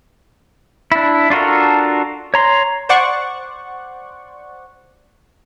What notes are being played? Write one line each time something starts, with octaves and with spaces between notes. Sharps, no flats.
D4 E4
D4 F4 F#4 A4 A#4
C#5 A#5 C6
C5 D5 F#5 C#6